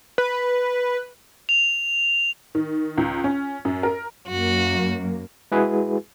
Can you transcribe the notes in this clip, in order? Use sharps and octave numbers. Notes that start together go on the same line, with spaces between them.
B4
F7
D#3
C#2
C#4
F#2
A#4
F#2 A#3 F#4
G#3 E4 F#4 G#4 B4